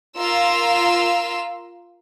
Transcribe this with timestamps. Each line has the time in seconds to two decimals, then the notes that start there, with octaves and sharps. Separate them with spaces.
0.18 F4 A#4 F5 E6